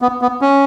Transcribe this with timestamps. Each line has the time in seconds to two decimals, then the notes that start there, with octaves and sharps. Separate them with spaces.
0.02 B3
0.22 B3
0.41 C#4